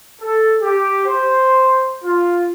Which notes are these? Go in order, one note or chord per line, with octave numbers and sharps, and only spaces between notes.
A4
G4
C5
F4